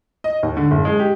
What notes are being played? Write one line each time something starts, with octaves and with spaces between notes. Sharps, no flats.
D#5
D#2
D3
F#1
G#3
G4